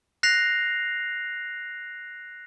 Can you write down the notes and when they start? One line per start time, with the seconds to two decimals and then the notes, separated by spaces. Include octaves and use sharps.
0.23 F#6 A#6 C7 F7